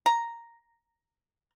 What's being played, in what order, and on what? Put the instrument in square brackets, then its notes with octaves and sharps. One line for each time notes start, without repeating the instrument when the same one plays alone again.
[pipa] A#5